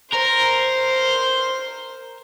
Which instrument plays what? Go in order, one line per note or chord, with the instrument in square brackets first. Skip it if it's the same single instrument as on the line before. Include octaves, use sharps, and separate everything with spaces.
[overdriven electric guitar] A#4 [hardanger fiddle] C5